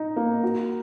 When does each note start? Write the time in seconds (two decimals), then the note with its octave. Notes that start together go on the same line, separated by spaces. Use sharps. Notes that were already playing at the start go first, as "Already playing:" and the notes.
Already playing: D#4
0.16 A#3
0.43 F#4